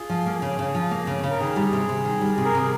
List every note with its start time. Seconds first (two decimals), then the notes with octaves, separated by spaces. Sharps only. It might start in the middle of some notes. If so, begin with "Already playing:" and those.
Already playing: F4 G#4
0.10 F3
0.26 A#3
0.42 C#3
0.59 C#3
0.75 F3
0.91 A#3
1.07 C#3
1.23 C#3
1.31 A#4
1.40 D#3 G#4
1.56 G3
1.73 C3
1.89 C3
2.05 D#3
2.21 G3
2.38 C3
2.45 A#4
2.55 C3 G#4